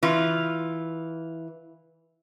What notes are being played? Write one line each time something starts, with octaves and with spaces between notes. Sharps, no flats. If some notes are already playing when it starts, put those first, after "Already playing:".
E3 F4